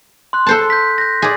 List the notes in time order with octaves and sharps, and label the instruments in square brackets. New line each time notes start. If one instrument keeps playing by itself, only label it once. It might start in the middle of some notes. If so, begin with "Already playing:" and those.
[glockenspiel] C6 F#6
[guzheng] A4 C5 A5
[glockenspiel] G6 B6
G6 A#6
[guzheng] G#4 D5